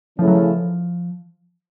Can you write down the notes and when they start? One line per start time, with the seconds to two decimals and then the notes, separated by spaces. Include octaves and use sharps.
0.19 C#3 E3 F3 A3 C#4 E4
0.27 F#3
0.35 F3